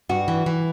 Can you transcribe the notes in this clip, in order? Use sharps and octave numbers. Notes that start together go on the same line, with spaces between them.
G2 F#4
E3
E3